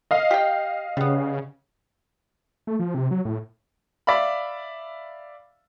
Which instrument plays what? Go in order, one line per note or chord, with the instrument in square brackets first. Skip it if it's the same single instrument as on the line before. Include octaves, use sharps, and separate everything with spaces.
[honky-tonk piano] D#5 F5
[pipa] G4 G5
[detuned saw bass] C#3 [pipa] G3 B3
[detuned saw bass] A3
F3
C3
F#3
A2
[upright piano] D5 E5 F5 B5